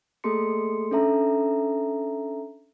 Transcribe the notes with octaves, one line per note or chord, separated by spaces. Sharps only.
A3 A#3 G#4 A4 C6 C#7
C#4 D4 A4 E5 A#5